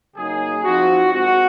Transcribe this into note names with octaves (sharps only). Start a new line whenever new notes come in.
C#3 F#3 A#3 D#4 G#4
F3 C4 D#4 F#4
A#2 G#3 C4 F#4